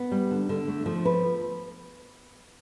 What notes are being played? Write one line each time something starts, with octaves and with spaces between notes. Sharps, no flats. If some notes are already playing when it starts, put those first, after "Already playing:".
Already playing: B3
G3
D3
D3
A3
F3
B4